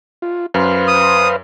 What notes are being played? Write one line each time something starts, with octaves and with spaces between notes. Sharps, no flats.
F4
F#2 B4 C5 F5
D#6